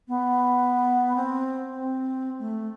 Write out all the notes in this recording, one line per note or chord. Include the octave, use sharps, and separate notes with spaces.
B3
C4
C4
A3